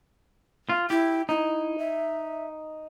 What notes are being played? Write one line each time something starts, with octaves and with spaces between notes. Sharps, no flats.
F4
E4 G4
D#4 E4
E5